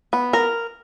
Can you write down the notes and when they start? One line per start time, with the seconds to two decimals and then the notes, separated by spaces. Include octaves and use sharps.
0.13 B3
0.33 A#4